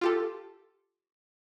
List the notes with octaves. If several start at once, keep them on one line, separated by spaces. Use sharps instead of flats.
F4 G4 A4